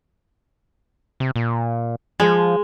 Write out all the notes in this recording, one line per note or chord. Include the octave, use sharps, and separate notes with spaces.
C3
A#2
F3 G#3